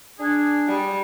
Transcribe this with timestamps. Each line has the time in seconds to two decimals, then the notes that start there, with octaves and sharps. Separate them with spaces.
0.19 D4 G#4
0.67 G3